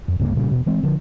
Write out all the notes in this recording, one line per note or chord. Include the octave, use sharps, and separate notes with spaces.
F2
C#2 G2 C#3 A#3
A#2 C#3 G3
E1 B2
E3 G#3 C4
D3 F3